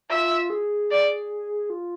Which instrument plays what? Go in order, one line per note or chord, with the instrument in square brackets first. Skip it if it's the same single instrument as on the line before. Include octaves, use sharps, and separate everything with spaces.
[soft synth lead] F4 [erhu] E5
[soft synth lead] G#4
[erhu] D5
[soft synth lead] F4